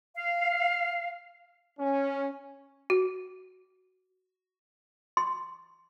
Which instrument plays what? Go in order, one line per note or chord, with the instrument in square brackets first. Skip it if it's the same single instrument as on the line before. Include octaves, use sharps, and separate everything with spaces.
[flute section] F5
[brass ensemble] C#4
[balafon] F#4
[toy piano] C6